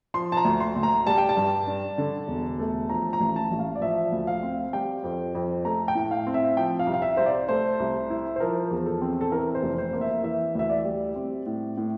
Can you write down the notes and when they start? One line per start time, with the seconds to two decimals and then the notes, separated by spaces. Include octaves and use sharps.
0.14 F3 C6
0.32 A5
0.37 A#5
0.45 D2
0.60 C6
0.76 D2
0.83 A#5
1.06 G3 A5
1.18 G5
1.29 A5
1.37 G2
1.67 D4
1.98 D3
2.28 E1
2.59 A3
2.89 F3 A#5
3.13 A#5
3.20 A1
3.36 A5
3.51 A1
3.59 F5
3.75 D5
3.82 F3 E5
4.12 D2
4.27 F5
4.43 C4
4.73 G3 G5
5.04 F2
5.35 F2
5.65 A3 A#5
5.88 G5
5.95 A2
6.11 F5
6.27 C4
6.34 E5
6.57 F3 G5
6.79 F5
6.87 C2
6.94 F5
7.02 E5
7.17 C2 C5
7.26 D5
7.49 A3 C5
7.80 C2
8.10 E4
8.36 C5
8.40 F3 A#4
8.71 E2
8.86 A4
9.02 C4
9.21 A4
9.32 E3 A#4
9.55 C5
9.63 F1
9.78 C5
9.93 A#3
10.01 E5
10.23 E3 E5
10.55 D2 E5
10.69 D5
10.85 G3
11.16 C4
11.46 A2
11.78 A2